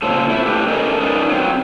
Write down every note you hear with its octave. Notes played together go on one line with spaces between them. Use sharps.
A#2 C#3 C4 A4
A3 E4
A3 G4 B4
C#4 A4 A#4 D#5
C#4 D#4 A#4 B4 D5 D#5
F#3 C4